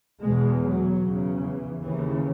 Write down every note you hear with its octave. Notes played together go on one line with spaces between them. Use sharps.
E2 B2 G#3
F#3
E2 C#3
E3
D#2 C#3 E3